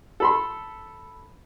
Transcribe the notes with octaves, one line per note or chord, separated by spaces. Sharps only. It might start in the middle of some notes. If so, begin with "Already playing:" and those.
A4 B5 C6